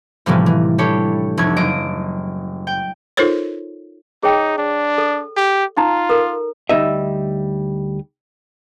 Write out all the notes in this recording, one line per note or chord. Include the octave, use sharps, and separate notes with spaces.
A2 C3 E3 F3 G3 G#3
E3
D4 E4 G4 A4 C#5
F1 C2 G#6
F#1 D#5 D7
G5
D#4 F4 A4 A#4 C5 C#5
D#4 G#4 C#5 G5
D4
A4
G4
D#4 F4 A#5
A4 A#4
D2 G3 D#4 D#5 E5